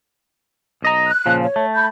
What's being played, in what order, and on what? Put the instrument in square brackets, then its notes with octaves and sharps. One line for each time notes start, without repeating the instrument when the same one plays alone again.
[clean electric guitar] B1 D#5 A#5
[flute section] F#6
[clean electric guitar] A#2 C#3 F3
[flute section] C#5
[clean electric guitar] A3
[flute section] B5 G6